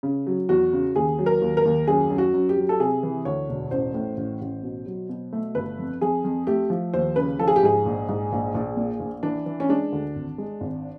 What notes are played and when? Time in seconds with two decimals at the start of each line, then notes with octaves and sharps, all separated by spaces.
0.03 C#3
0.27 F#3
0.49 E2 F#4
0.73 C#3
0.96 D#2 G#4
1.19 F#3
1.26 A#4
1.41 D#2
1.57 A#4
1.65 D#2
1.87 F#2 G#4
2.10 F#2
2.18 F#4
2.34 F#2
2.49 G4
2.57 F#3
2.69 A4
2.79 C3 G#4
3.03 E3
3.25 D2 C#5
3.49 E1
3.71 A1 C5
3.94 A2
4.17 A1
4.41 A1
4.63 B2
4.86 F#3
5.09 B2
5.33 A3
5.55 G1 B4
5.78 F2
6.01 F2 G#4
6.25 F2
6.47 A3 G4
6.70 F3
6.94 D#2 C5
7.16 C#3 B4
7.39 F3 A4
7.48 G#4
7.56 G4
7.63 G#2 G#4
7.86 A#1
8.09 G#2
8.32 A#1
8.55 A#1
8.77 A#2
9.00 A#1
9.23 E3 D4
9.46 E3
9.60 C#4
9.69 G#3 D4
9.92 D2
10.15 G#1
10.38 G#3
10.61 G#1